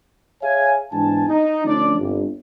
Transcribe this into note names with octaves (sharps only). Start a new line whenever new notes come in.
G#4 C#5 E5 F5 G#5
E2 G#2 D4 G#5 A5
D#4
D3 F3 A3 C#4 D4 D5
G1 C2